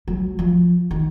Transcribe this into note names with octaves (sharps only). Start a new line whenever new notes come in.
F#3
F3
D#3